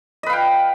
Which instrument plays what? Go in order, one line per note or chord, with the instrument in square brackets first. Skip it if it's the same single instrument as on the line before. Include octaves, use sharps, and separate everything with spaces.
[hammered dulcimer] D#5
B4
F5
G5